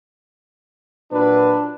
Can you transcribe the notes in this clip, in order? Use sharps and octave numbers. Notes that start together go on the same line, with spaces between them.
A#2 F#3 D4 B4